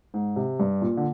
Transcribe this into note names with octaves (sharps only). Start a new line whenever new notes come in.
G#2
C3
G2
A#2
D3